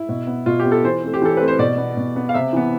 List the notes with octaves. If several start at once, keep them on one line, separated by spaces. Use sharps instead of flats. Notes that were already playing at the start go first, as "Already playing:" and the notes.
Already playing: E4
B2
B3
B2 F4
G4
B3
A4
E3 C5
A3 C4
G4
E3 A4
A3 C4 B4
C5
B2 D5
B3
B2
B3
F5
C3 E5
E3 B3